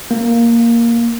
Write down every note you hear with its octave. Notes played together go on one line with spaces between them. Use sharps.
A#3